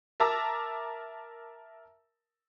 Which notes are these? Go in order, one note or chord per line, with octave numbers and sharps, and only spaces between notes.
A#4 E5 A5 A#5 D6 E6